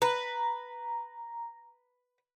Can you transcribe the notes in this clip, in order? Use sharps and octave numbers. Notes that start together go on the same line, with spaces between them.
B4 A#5